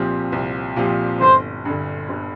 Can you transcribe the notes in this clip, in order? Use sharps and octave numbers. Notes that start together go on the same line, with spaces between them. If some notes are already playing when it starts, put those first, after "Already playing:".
Already playing: C2 A#2 F3 C4 G4
C2
A#2 F3 C4 G4
G1 C5
G2 D3
G1